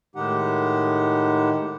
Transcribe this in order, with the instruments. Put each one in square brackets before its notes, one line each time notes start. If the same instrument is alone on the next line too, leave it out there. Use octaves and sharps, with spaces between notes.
[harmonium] A2 D#3 G#3 D#4 G4 F#5